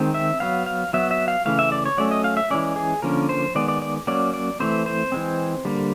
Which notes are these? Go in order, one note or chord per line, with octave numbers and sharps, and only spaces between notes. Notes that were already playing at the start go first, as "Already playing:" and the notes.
Already playing: D#3 G#3 C4
E5
F#3 B3 F5
F5
F#3 B3 E5
E5
F5
C#3 E3 A3 F5
E5
D5
C#5
F#3 A3 C#4 D5
D#5
F5
E5
E3 G#3 C#4 D5
G#4
D3 F3 A#3 C#4 A#4
C5
D#3 G#3 B3 D5
D5
D5
F#3 A#3 C#4 D5
D5
E3 A3 C4 C5
C5
E3 G#3 C4
D3 G3 A#3